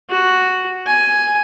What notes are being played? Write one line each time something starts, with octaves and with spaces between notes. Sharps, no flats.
F#4
G#5